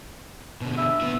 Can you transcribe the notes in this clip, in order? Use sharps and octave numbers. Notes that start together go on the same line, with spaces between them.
B2 D3
E5
B3 E4